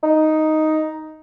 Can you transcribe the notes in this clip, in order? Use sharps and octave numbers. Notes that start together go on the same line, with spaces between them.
D#4